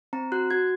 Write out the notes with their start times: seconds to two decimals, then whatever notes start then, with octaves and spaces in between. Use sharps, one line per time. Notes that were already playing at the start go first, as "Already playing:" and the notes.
0.13 C4 A#5
0.32 F#4 F#6
0.50 F#4 G#6